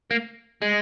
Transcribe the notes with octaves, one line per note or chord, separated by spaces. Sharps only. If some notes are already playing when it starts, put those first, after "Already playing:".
A#3
G#3